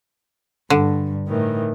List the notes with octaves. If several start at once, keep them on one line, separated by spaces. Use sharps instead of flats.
G2 D3
A2 D#3 E3